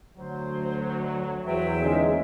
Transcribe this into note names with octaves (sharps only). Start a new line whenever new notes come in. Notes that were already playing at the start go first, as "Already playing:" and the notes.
D2 F#3 C5
E2 F#3 C5 E5 G5
A#2 D3 G#3 C#4 D#4 G#4